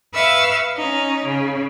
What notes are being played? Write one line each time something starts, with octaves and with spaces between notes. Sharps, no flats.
B4 E5 F5 C#6 E6
C#4 D#4
C#3